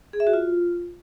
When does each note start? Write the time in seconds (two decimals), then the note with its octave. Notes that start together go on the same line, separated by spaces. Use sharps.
0.13 G#4
0.20 E5
0.27 F#4
0.33 F4